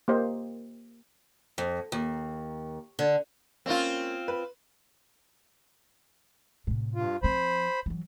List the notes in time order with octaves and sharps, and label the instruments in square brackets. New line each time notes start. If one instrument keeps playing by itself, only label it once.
[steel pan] A#3 G4 C5 D#5
[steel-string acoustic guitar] F2
D#2
D3
[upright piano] A#3 C#4 [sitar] C4 F4
[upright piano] B4
[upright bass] A2 C3
[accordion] G2 F4
[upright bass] F3 C4 [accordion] C5 B5
[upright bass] E3 F#3